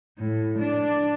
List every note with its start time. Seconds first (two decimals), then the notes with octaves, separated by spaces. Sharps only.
0.18 A2
0.59 D4